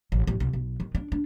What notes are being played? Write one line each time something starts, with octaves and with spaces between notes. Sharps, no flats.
A1
A1
C2
B1
D#3
D4
D4